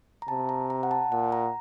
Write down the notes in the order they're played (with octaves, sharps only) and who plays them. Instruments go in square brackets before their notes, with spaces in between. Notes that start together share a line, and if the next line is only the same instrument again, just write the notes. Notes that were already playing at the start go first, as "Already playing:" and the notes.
[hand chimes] A#5
[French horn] C3 [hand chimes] A5
[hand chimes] A#5
A#5
F#5
A5
[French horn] A#2 [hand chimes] F#5
[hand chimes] A#5